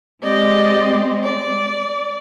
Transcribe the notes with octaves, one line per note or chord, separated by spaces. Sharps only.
G#3 C4 G4 D5 D#5
D5